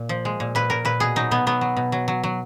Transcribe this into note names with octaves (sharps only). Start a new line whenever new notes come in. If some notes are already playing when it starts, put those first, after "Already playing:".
Already playing: A#2
F3
G#3
A#2
A#2 B4
A#2 A#4
A#2 B4
B2 G#4
F#3 D#4
B2 B3
F#3 B3
F#3
B2
F#3
F#3
F#3